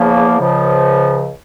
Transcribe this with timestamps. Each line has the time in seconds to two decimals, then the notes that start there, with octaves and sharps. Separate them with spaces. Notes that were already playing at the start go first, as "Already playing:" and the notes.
Already playing: E2 C#3 F3 A#3
0.39 C#2 C#3 F3